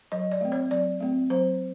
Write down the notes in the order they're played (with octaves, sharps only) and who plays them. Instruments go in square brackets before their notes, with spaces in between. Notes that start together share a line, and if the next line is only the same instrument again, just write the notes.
[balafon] F#3 D#5
D5
A3 C4
C#5
F#3 D5
A3 C4
F#3 C5